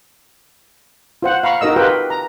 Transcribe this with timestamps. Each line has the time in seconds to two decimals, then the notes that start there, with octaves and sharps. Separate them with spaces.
1.22 F4 C5 F#5
1.43 F5 A#5 B5 C#6
1.61 D#4 F#4 A#4 D#5 E6
1.76 F4 G4 A#4 B4 G5
2.10 A#5